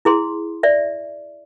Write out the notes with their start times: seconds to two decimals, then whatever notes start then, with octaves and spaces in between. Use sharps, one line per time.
0.05 E4 G#4 C6
0.63 D5 E5